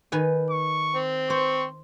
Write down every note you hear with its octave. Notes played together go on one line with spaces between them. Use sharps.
D#3 B4 G#5
C#6
C4
C5 C#6